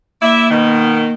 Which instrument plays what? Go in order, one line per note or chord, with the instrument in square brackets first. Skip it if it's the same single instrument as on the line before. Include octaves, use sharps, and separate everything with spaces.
[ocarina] A#3 [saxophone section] E4 D5 E5
[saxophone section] B2 D#3